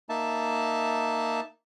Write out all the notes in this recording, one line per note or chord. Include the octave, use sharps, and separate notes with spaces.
A#3 D#4 E5 A5